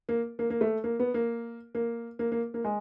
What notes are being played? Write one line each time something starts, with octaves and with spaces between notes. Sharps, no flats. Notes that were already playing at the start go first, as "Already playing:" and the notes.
A#3
A#3
A#3
A3
A#3
B3
A#3
A#3
A#3
A#3
A#3
G#3